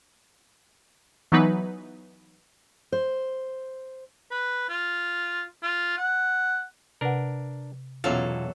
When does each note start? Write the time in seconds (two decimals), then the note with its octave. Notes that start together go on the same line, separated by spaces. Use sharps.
1.32 E3 F#3 B3 D#4 B4
2.92 C5
4.31 B4
4.69 F4
5.63 F4
5.97 F#5
7.01 C3 D4 A#4 B4 F#5
8.04 B1 E2 B2 F#3 C#4 F4 A4 F5